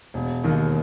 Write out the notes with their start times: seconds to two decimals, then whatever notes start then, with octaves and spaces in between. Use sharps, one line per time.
0.14 E1
0.44 D#2 D#3